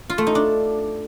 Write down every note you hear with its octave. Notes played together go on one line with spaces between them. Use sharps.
F4
A3
D#4
D4